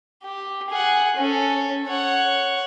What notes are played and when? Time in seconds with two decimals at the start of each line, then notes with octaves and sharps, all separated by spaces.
0.23 G4
0.70 G#4 F#5
1.16 C#4 A4
1.86 C#5 F#5